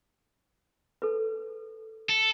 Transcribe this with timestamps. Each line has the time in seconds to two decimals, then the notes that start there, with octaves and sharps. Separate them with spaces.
1.02 A4 B4
2.10 A4